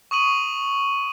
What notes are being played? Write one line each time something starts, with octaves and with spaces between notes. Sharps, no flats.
C#6 D#6 D#7 F#7